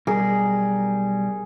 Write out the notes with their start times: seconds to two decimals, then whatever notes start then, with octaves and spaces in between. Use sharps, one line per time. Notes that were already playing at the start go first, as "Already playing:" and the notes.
0.07 B1 G3 G#4 A#4